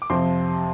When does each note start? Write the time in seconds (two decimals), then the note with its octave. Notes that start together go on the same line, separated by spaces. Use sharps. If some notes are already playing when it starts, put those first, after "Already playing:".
0.02 D6
0.10 F2 C3 F3 C4 C6